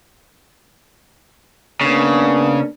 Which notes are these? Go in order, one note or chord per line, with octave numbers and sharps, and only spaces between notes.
C#3 A#3 B3 D4